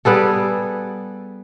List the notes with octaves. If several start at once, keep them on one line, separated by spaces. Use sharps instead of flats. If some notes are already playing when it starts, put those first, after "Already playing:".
G3 B3 G#4 A4